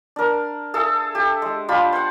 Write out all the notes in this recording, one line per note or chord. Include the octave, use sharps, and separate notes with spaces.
D4 A#4
G#4 A4 E5
G4
G#3
D4 F4 G4 B5
C5 F#5